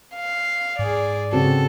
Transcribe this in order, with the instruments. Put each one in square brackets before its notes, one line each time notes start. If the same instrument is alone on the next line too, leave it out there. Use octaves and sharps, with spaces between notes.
[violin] F5
[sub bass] G#2 [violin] G#4 D5
[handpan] C#3 C4 F#4 [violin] A4